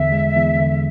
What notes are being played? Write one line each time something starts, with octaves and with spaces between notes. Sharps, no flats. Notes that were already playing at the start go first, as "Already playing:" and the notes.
Already playing: E2 D3 E5
G#3
E2
D3